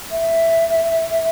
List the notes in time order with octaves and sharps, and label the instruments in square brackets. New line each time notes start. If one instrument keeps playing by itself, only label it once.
[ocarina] E5